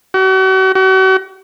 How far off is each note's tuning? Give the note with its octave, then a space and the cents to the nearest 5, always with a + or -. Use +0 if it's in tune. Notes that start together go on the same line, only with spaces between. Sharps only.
F#4 +40
F#4 +40